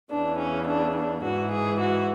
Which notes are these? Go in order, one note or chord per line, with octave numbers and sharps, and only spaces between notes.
E2 C#3 E3 D4
C#4
D4
D4
G#2 E3 F#4
G#4
F#4